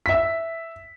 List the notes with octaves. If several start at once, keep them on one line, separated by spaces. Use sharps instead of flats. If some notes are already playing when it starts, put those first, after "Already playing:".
E5 B6